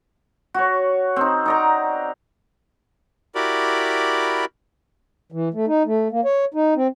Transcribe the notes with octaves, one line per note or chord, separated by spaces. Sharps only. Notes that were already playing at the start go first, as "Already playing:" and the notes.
F#4 C#5
C4 D#4
D#4 D5 A#5
E4 F#4 G4 A#4 D5 B5
E3
A3
D#4
A3
A#3
C#5
D#4
C4